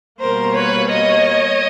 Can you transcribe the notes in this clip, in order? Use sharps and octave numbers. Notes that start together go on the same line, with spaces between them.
B2 G3 A#3 A#4 C5
B4 C#5
C#5 D#5